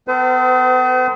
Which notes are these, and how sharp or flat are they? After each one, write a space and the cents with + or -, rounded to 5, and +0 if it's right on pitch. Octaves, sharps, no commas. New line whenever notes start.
B3 +45 A4 +45 C5 -40